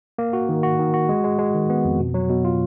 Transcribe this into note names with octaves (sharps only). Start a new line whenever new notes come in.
A#3
F#4
D#3
F#4
D#3
F#4
G#3
G#3
G#3
D#3
B3
F2
B2
F#3
B2
F4